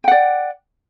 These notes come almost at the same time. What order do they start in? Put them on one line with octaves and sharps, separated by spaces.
G5 F#5 D5